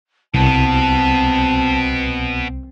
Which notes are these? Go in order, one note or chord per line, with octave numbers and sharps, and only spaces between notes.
C2 B2 B3 C4 A5